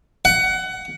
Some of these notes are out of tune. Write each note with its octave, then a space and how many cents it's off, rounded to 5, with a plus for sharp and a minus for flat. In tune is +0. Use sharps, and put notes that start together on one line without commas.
F#5 +20